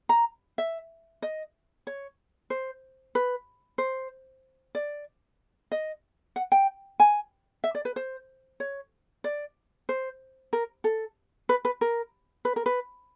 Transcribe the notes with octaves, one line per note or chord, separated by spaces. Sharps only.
A#5
E5
D#5
C#5
C5
B4
C5
D5
D#5
F#5
G5
G#5
E5
D5
B4
C5
C#5
D5
C5
A#4
A4
B4
B4
A#4
B4
A#4
B4